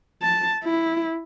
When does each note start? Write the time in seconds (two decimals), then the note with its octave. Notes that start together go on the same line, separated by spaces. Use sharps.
0.22 A5
0.64 E4